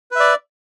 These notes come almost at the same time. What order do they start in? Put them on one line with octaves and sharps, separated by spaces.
B4 E5 D5